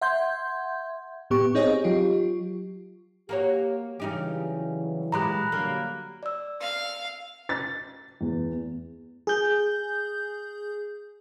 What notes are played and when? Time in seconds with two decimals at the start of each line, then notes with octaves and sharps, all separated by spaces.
0.01 E5 F#5 C6 G6 G#6
1.30 A2 B3 G4 C#6
1.55 C4 D#4 G#4 C#5 D#5
1.84 F#3 F4 G4
3.29 A#3 F#4 G4 C#5
4.00 C#3 E3 F#3 G3 D#4 G4
5.12 A#2 G#3 G4 A#5 B5 F#6
5.52 D3 F#3 G3 A#3
6.23 D5 E6
6.60 F5
7.49 A6
8.21 E2
9.27 G#4 G6